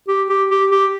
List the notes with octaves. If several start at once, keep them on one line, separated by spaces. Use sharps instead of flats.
G4
G4
G4
G4